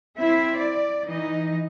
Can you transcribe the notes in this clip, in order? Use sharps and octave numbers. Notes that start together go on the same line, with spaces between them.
C4 E4 E5
D5
E3 D#4 D#5